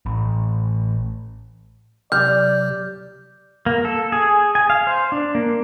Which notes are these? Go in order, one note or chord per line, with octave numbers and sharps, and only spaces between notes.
A1
C3 F#3 G4 D5 F6 G6
A#3
A4
G#4
G#5
F5
C5
D4
A#3